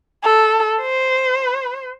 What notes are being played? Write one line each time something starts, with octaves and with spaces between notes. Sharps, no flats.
A4
C5